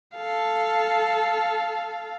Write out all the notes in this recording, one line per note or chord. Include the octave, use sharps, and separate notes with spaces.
A4 F5